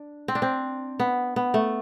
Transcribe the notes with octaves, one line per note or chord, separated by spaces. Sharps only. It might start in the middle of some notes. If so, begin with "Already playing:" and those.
Already playing: D4
C4
D4
C4
B3
B3
A3